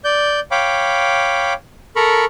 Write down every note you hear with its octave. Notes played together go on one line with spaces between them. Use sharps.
D5 G6
C#5 F5 G5 B5 D6
A4 A#4 A#5 B5 C#6